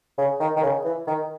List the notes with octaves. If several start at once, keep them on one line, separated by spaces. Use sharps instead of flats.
C#3
D#3
D#3
C#3
E3
D#3